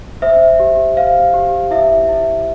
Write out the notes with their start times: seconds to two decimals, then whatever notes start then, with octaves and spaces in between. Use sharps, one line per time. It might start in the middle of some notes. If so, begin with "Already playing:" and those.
0.22 C5 E5
0.60 G4
0.96 C5 F5
1.34 G4
1.71 E4 E5
2.09 E4